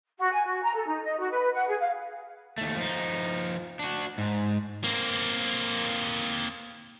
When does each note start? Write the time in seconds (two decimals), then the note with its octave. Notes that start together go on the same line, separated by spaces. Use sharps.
0.18 F#4
0.32 G#5
0.45 F#4
0.62 A#5
0.74 A4
0.86 D#4
1.03 D#5
1.18 F#4
1.31 B4
1.53 F#5
1.68 G#4
1.80 F5
2.58 D#2 A3
2.76 F3 D#4
3.79 D4 F#4
4.18 G#2
4.84 A#3 C4